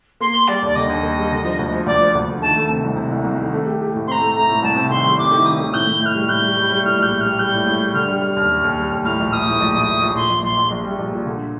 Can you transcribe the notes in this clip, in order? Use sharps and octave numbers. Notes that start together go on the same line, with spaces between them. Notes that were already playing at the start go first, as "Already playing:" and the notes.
A#3 C6
A#3
G3 D5
D#2 D5
D3 D#5
D#2
A#3
G3
D3
F3
D2
F3
D2 D5
F3
D2
D3
D#3 A5
A3
C3
C2
C3
C2
C2
D#3
A3
G4
G4
A2
C4 A#5 C6
A3
A3 A#5
A2
C2 A5
C3
D#3 C6
G3
C2 D6
D#3
D#3 D#6
D#3
A2 G6
A2
A2 F6 G6
G3
A2 G6
G3
G3
G3
A2 F6
A#1 G6
A2
G3 F6
G3 G6
A2
A2
G3
D3 F6
G3
G3
D#2
G3
D#2
G3
D#2
A2 F6
A#1
A#1 D#6
A2
A#1
A#1
A#1
A#1
A#2 C6
A#1
A#1 C6
A#1
A#1
G3
A#1
A#2
D3